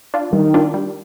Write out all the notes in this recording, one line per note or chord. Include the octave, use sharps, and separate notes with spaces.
D4 F4
D#3 G3
D4 F4
G3